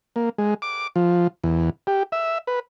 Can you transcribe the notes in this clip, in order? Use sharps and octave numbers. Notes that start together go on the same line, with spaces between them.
A#3
G#3
D6
F3
E2
G4
E5
B4